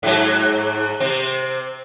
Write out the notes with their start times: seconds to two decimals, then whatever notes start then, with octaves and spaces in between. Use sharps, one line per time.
0.03 G#2 F#3
1.00 C3 C4